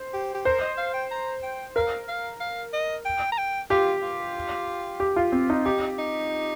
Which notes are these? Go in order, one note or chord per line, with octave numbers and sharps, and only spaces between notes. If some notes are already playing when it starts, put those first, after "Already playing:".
Already playing: C5
G4
G4
A#4 C5
D#5
F5
G5
A#5
G5
A#4 F5
F5
F5
D#5
G5
A#5
G5
F4 G4
F4
G4
F4
C4
D#4
D#4 G4
D#4